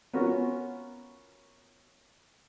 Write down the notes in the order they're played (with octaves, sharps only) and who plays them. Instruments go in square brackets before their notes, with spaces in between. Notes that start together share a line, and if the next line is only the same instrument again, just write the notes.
[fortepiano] B3 C#4 F4 F#4 A#4